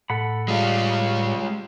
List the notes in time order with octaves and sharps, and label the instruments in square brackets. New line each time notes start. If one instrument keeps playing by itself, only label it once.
[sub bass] A2 [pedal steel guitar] A4 F#5 B5
[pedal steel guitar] G3 [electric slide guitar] G#3 F4